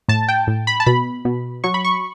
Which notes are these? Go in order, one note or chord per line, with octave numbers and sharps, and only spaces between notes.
A2 A5
G5
A2
B5
A5
B2 B5
B2
F#3 C#6
B5
C#6